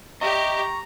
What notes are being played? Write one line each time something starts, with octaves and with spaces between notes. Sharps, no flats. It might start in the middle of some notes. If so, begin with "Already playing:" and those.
G4 D#5 E5 A#5 C#6